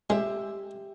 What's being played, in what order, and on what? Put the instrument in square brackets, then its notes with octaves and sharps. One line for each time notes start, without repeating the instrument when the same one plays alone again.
[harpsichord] G#3 [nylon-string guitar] G4 E5